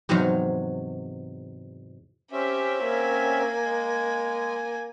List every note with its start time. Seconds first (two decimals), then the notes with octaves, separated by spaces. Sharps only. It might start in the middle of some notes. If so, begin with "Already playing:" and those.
0.09 E2 G#2 C3 F#3 F#4 F5
2.32 C4 C#4 G4 E5
2.84 A#3 G#5
3.64 G#3